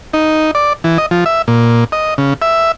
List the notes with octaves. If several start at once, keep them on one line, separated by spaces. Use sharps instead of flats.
D#4
D5
E3
D#5
F3
E5
A#2
D#5
C#3
E5